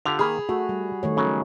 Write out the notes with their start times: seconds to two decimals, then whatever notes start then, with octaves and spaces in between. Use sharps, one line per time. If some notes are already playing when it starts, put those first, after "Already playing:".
0.05 D3 F4 G4 F7
0.19 D#3 A#3 G#4 B5
0.49 A3 F#4
0.69 G3
1.03 D#3 A3 C#5
1.17 C#3 F#3 C#4